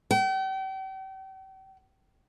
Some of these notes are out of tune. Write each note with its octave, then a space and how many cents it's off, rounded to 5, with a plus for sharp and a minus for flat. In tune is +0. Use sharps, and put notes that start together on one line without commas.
G5 -40